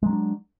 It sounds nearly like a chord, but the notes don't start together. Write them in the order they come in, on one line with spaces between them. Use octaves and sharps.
G#3 F#3 C#4 D4